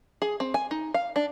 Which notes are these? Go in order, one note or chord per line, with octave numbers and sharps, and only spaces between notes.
G#4
C4
G#5
D#4
F5
D4